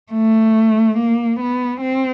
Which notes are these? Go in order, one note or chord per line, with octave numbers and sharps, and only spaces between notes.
A3
A#3
B3
C4